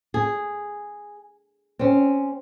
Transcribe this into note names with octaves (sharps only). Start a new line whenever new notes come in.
G#4
C4 C#4